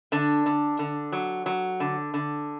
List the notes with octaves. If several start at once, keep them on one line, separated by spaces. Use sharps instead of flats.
D3 D4
D3
D3
F#3
F#3
D3
D3